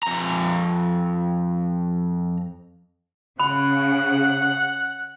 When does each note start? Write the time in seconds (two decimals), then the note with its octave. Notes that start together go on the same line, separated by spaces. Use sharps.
0.03 F2 A#5
3.40 C#3 F#5 B5